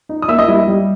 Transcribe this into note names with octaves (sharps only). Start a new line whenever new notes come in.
D#4
D#6
A#3 E5 E6
D#5 D#6
G3 E4 E5
D#5
G3